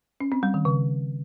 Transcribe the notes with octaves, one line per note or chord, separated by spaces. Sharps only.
C#4
C4
G3
D#3
C#3